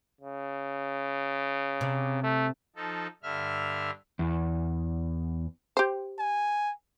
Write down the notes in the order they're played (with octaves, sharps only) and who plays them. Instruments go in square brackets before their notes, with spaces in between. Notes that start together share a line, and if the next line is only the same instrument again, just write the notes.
[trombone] C#3
[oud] C3
[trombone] A3
[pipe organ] F3 D#4 A4
G2 D3 E5 F6
[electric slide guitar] E2
[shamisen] G4 C5
[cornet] G#5